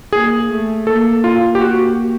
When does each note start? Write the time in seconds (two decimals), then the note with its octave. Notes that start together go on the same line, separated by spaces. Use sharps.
0.12 A#3 G#4
0.49 A3
0.87 A#3 A4
1.24 A#3 F4
1.55 G4
1.61 F#4